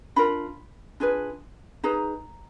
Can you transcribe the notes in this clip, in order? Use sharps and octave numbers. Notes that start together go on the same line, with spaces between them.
D4 F4 A#4 B5
D4 F4 G#4 B4
D#4 G#4 B4 A#5